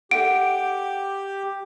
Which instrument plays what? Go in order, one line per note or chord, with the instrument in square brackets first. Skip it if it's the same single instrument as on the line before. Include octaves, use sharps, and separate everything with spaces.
[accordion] G4 [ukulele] A4 E5 F#5 [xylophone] D7